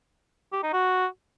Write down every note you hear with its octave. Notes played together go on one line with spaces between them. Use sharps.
G4
D#4
F#4